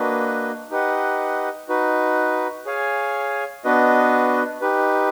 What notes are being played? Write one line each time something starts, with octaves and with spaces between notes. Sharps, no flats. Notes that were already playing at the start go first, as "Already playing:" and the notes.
Already playing: A#3 D4 F#4 B4 D#5
D#4 G4 B4 D#5 F#5
D#4 F#4 B4
G#4 C#5 F5 G#5
B3 D4 F#4 B4 D#5
D#4 G4 B4